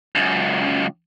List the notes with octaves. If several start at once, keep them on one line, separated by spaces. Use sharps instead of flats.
C#2 F#2